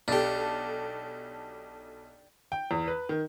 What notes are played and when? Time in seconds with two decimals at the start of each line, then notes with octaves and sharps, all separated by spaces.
0.08 B1 D4 G4 A4
2.52 G5
2.71 E2
2.88 B4
3.09 D#3